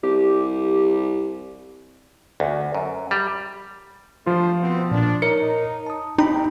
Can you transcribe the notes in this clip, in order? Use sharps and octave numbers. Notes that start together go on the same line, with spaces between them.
C2 G4
D2
F#2
G3
G2 F3 A3 F4 C5
B2 B3 C4
A#2 A#3 D4
D#4 A#4 C#5 C#7
A5 D#6
D#2 C3 D#4 G5 A#5 B5